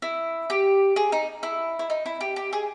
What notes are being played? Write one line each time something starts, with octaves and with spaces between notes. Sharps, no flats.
E4
G4
G#4
D#4
E4
E4
D#4
E4
G4
G4
G#4